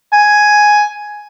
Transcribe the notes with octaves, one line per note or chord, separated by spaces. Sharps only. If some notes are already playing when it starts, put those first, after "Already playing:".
G#5